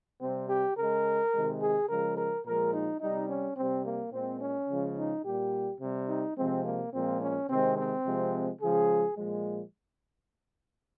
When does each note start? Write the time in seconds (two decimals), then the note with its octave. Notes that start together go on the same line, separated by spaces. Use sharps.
0.21 C3 G3 C4
0.49 G4
0.77 C#3 G#3 A#4
1.33 C3 D#3 G#3
1.62 G#4
1.89 C#3 F3 G#3 A#4
2.17 A#4
2.45 A#2 F3 G#3 A#4
2.74 D#4
3.01 C3 G3 D#4
3.29 C#4
3.57 C3 G3 C4
3.86 A#3
4.13 A#2 G#3 C4
4.41 C#4
4.70 C#3 F3 G#3
4.98 D#4
5.25 A#2 G3 G4
5.81 C3 G3
6.09 D#4
6.37 C3 F3 G#3 C4
6.65 A#3
6.93 A#2 F3 G#3 C4
7.21 C#4
7.50 C3 D#3 G#3 C4
7.78 C4
8.05 C3 F3 G#3
8.61 C#3 F3 G#3 G#4
9.18 A#2 F3 G#3